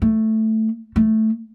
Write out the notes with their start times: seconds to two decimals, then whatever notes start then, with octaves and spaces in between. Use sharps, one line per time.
0.02 A3
0.96 A3